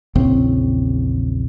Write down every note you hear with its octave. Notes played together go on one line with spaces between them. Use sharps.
A#1 E2 C#3 C4